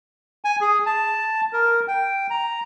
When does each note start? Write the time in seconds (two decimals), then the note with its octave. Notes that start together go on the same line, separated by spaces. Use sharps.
0.45 G#5
0.61 G#4
0.86 A5
1.53 A#4
1.88 G5
2.30 A#5